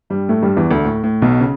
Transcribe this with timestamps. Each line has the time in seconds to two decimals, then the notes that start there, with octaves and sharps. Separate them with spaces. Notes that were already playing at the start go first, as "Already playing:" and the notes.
0.10 G2 G3
0.29 A2 A3
0.42 G2 G3
0.57 E2 E3
0.71 D2 D3
0.85 A2
1.04 A2
1.22 B1 B2
1.40 C#3